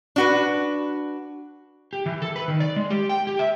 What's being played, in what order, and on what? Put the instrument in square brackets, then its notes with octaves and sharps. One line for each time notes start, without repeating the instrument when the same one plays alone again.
[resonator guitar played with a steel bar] D4 F#4 B4
[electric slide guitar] G4
E3
A4
B4
D#3
D5
G#3
G4
G5
G4
E5